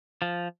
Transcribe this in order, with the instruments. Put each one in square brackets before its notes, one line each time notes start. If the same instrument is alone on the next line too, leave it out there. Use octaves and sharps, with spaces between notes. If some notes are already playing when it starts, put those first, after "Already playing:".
[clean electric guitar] F3